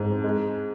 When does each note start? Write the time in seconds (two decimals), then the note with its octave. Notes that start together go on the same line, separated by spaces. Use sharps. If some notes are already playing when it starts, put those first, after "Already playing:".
Already playing: G#2 C4
0.24 G#3